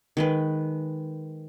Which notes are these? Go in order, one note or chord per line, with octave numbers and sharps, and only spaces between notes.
D#3 G#3 B4